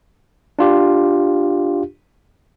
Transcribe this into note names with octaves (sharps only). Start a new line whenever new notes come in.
D4 F4 G4